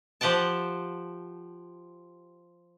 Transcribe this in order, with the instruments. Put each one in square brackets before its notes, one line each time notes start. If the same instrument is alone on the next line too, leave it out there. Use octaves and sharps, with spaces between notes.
[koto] F3 G4 F#5 G5 A5